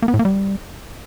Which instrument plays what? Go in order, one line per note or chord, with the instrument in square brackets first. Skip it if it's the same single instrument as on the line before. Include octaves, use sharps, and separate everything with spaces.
[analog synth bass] A#3
B3
A2
A#3
G3